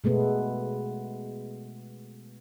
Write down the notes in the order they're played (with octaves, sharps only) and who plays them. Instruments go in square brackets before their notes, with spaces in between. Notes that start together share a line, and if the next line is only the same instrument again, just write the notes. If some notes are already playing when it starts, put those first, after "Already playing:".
[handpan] B2 G#3 A3 B3